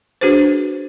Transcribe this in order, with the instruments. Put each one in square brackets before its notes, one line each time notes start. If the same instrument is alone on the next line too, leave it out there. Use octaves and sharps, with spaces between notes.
[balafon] D4 F#4 G#4 B4 C5